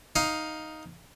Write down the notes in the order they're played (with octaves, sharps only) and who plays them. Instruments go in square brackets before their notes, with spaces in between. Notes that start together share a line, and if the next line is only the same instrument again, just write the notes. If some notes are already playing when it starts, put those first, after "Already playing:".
[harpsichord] D#4 F5